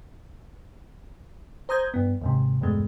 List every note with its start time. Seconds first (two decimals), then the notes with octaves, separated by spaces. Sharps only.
1.69 C5 A#5 D#6 G6 G#6
1.94 G2 B3
2.22 D#2 G#2 C3
2.61 E2 G2 B2 G#3 A3